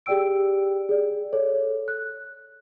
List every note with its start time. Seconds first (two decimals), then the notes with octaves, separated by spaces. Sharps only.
0.06 G4 G#4 D5 G5 E6 D7
0.89 G#4 D5
1.33 A4 C#5
1.88 F#6